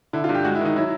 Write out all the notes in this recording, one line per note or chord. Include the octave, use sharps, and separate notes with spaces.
D3 E4
F4
G2
G4
G#3 F#4
E4
D#3 D#4
F#3 E4